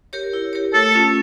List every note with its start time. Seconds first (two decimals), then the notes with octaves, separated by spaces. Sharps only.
0.13 G4 A#4 C#5
0.33 E4
0.53 G4 A#4 C#5
0.74 A3 A4
0.94 C#4 F4